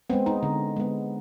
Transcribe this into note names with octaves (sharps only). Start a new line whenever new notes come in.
G#3 B3 C4
D#4
D3
G#3 B3